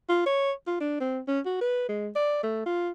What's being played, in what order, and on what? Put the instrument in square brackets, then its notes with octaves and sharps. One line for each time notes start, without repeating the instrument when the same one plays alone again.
[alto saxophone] F4
C#5
F4
D4
C4
C#4
F#4
B4
G#3
D5
A3
F4